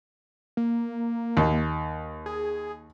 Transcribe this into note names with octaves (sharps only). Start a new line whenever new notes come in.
A#3
D#2
G#4